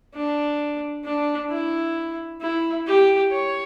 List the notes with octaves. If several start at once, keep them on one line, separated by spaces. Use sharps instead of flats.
D4
D4
E4
E4
G4
C#5